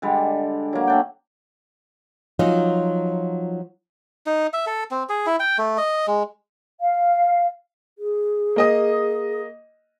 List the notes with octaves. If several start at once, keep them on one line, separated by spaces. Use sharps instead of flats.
D3 G3 G#3
F#3 A#3
A3 D4 G5
F3 F#3 C#4 D#4 F4
D#4
E5
A4
C4
G#4
E4
G5
A3
D#5
G#3
F5
G#4
A#3 D#5 D#6